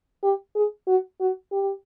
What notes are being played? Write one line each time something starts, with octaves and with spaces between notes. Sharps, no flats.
G4
G#4
F#4
F#4
G4